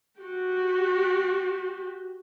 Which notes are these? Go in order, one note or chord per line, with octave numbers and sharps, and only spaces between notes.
F#4 G4